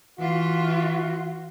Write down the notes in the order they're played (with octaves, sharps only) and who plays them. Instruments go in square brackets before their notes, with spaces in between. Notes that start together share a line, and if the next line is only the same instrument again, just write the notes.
[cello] E3 F4 [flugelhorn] F#4